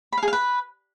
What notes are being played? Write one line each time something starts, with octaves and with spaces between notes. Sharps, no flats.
B5
F5
G#4
F5
B4